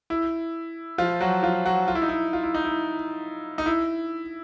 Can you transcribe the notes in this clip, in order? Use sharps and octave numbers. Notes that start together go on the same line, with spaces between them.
E4
F3 F4
F#3 F#4
F3 F4
F#3 F#4
F4
E4
D#4
E4
F4
E4
D#4
E4
D#4
E4